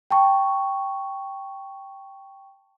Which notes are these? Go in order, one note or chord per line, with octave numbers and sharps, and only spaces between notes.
G5 A5 C#6